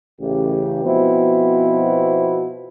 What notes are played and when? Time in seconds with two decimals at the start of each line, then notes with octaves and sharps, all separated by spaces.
0.21 A1 C#3 G4
0.84 B2 F3 B3 C4 E4 F#4